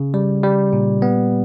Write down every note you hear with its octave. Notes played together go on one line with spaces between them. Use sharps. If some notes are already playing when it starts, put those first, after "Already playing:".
Already playing: C#3
G3
G3
A#2
B3